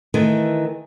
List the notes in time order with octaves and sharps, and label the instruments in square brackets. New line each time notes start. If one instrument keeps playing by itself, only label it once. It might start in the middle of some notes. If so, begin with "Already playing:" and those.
[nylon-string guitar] D#3 E3 A3